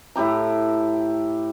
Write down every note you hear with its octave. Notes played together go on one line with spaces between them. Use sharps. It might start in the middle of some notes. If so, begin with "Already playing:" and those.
A2 E4 G4 A#5